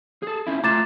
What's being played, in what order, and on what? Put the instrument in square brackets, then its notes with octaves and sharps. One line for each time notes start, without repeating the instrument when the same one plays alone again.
[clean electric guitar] G#4 A4
C4 C#4 E4
[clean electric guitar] A3 F4 A#5 [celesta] D6 A6 E7